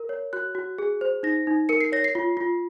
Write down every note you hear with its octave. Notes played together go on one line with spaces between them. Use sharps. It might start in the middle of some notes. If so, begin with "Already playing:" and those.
Already playing: A#4
C#5
F#4 F#6
F#4
G#4
C5
D#4 A#6
D#4
A#4 C#7
C7
C#5 A#6
C7
F4
F4